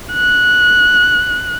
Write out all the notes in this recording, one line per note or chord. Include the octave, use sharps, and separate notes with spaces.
F#6